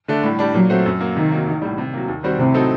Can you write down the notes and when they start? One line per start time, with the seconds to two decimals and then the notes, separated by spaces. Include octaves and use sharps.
0.08 D3 A3 D4
0.23 A2 G3
0.39 G3 D4
0.54 A#2 F#3
0.70 A3 C4 F#4
0.86 F#2
1.01 F#3 A#3
1.16 C3 D#3
1.32 F#3 A#3
1.47 A1
1.62 A2 G3
1.78 C3
1.94 F#3 A#3
2.08 D#2
2.23 D#3 G3 C4 F#4
2.39 A2 C3
2.54 F#3 C4 D#4 A4